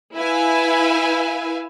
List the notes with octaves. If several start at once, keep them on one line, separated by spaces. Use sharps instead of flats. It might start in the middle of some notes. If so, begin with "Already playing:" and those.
E4 B4 E5 F5 G#5